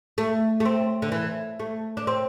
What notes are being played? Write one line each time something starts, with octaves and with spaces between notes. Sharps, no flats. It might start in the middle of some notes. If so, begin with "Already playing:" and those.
A3
A3
C4
D3
E3
A3
D4
C4